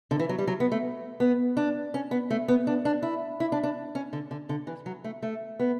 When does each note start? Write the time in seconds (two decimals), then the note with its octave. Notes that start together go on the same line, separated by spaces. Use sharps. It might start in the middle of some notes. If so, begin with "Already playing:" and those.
0.11 D3
0.19 E3
0.29 F#3
0.38 G3
0.47 F#3
0.60 B3
0.72 A3
1.20 B3
1.57 D4
1.94 C#4
2.11 B3
2.31 A3
2.48 B3
2.67 D4
2.85 D4
3.03 E4
3.40 E4
3.52 D4
3.63 D4
3.95 C#4
4.13 D3
4.31 D3
4.49 D3
4.67 E3
4.86 F#3
5.04 A3
5.23 A3
5.60 B3